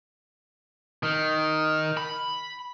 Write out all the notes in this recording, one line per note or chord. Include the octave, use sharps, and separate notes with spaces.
D#3
B5